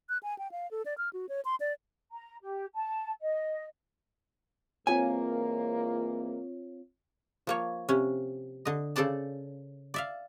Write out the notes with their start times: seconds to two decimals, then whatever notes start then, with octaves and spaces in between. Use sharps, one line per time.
0.09 F#6
0.23 G#5
0.38 G5
0.52 F5
0.71 A4
0.86 D5
0.98 F6
1.13 F#4
1.29 C#5
1.45 C6
1.60 D5
2.11 A#5
2.43 G4
2.74 A5
3.22 D#5
4.87 G#2 E3 A#3 C4 F4 C#5 G#5
7.47 F3 A#3 C#5
7.89 C3 C#4
8.65 D3 D#5
8.96 C#3 A4 C5 D5 A5
9.94 D5 E5 F5